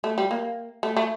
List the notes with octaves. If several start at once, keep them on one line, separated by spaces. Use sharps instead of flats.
A3
G3
A#3
A3
A3